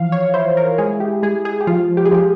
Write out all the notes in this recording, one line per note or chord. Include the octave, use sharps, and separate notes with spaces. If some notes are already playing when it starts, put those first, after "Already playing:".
Already playing: E3 F3 F5
C#5
E4 C5
A#4
G#3 G#4
G4
G#3 G#4
G#4
G4
F3 F4
G4
G#4
F3 G4